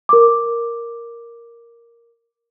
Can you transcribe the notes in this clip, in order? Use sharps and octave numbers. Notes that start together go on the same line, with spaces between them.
A#4 D6